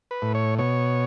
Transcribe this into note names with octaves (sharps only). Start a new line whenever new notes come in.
B4
A2
C#5
B2 C#5